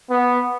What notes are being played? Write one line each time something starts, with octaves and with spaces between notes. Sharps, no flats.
B3